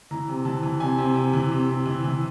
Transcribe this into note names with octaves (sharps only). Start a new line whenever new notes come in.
E3 A#5
C3
E3 A5
E3
C3 G#5
C3
C3
E3
C3
C3
E3
E3